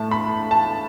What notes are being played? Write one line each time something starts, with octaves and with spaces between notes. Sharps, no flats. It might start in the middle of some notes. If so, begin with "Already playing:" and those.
Already playing: A2 A3 E4 A5
B5
A5